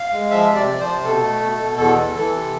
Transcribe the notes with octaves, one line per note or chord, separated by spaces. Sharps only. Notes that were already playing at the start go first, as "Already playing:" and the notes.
Already playing: F5
G#3
F3 E5
C3
D5
F3
C5
C3
B2 A4
A3
B2
B2
E2 A4
E3
E3 A4
C3